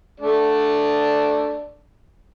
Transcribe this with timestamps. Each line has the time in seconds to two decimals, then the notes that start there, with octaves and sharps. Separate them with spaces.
0.20 A3 D4 D5